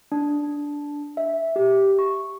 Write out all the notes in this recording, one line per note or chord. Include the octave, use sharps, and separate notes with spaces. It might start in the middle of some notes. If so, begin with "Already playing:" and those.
D4
E5
G4
C#6